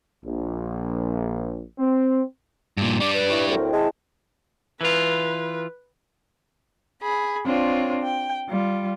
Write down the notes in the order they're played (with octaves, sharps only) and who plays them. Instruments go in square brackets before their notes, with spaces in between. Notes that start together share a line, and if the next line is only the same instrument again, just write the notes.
[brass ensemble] A#1
C4
[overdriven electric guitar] G2 A#2
[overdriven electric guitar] G3 D4 [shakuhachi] D6
[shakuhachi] B4
[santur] E4 C#5
[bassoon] D2 [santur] C4 [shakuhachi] A#4
[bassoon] G#3 [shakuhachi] A5
[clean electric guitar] E3 F4 [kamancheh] B4
[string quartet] G#4 B5
C4 D4 F4 C#5
G5
G3 F4